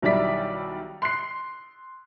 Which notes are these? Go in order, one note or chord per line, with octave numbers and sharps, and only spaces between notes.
B1 D#3 G3 E4 D5 B6
C6 F#6 C7